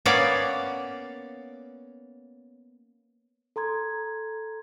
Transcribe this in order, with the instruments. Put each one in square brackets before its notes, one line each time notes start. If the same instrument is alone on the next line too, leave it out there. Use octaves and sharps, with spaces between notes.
[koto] A#3 B3 C#4 C#5 D5
[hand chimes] A4 A#5 C6 G#6